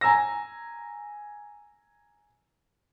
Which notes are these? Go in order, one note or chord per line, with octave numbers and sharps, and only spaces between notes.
G#5 A#5 E6 A#6